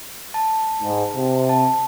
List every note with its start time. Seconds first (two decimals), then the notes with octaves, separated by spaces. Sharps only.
0.34 A5
0.82 G#2
1.16 C3
1.49 A5